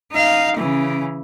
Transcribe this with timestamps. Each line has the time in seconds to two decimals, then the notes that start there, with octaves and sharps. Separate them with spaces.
0.12 D#4 F5
0.57 C#3 E3